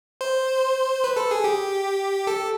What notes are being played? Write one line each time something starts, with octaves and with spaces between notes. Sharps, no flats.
C5
B4
A4
G#4
G4
A4